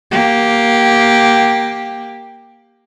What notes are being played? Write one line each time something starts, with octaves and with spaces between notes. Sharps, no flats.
A#3 G4